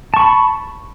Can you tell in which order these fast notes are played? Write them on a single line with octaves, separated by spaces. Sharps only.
A5 C#6 B5